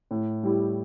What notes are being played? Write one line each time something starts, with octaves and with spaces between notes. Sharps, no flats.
A2
G3 E4 G4